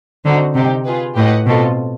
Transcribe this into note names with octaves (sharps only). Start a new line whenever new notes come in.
D3 C4 D#4 F#4
C3 C4 D#4 G4
F4 G#4 B4
A2 G4 B4 D#5 F#5
B2 C4 F4 A4